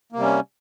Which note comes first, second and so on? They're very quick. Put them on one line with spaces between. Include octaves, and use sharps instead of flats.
A#3 C3 G3 C#4